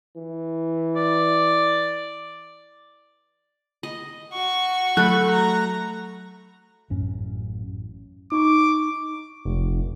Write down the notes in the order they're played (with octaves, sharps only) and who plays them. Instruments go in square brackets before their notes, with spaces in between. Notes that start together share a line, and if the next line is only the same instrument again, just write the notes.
[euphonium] E3
[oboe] D5
[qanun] D#5
[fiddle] F#4 C#6
[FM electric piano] F#3 F#6 [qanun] A3 B5
[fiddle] A#5
[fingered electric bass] A1 F#2 C#4
[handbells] D#4 C#6 [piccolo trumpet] D6
[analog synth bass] F1